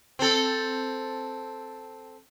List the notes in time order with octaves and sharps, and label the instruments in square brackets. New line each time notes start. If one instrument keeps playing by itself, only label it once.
[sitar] C4 A4